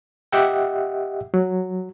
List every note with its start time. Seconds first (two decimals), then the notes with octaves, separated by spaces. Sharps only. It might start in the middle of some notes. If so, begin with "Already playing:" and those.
0.32 G4 D#5 E5 F#5 G5
1.34 F#3